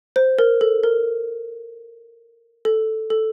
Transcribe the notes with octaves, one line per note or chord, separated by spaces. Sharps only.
C5
A#4
A4
A#4
A4
A4